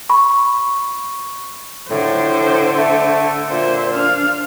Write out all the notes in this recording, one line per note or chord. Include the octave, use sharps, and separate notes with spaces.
B5 C#6
A2 D3 C5
A3
A#2 C5 E5
D4 F5